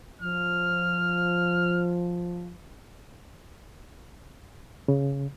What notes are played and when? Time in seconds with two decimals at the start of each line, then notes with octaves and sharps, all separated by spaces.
0.22 F3 F6
4.88 C#3